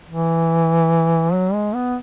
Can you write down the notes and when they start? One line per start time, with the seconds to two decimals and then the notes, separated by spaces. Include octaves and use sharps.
0.09 E3
1.33 F#3
1.53 G#3
1.75 B3